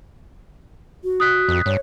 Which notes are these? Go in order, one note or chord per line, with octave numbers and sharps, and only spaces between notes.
F#4
D#6 F#6 B6
F2
G2 C#5